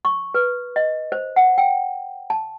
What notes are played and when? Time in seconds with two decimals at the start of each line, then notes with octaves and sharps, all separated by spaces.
0.05 C#6
0.34 B4
0.76 D#5
1.12 C5
1.36 F#5
1.58 G5
2.30 A5